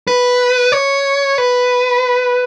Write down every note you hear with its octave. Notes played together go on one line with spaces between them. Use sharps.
B4
C#5
B4